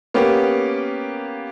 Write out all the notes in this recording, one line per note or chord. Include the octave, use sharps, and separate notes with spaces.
A#3 B3 C#4 G4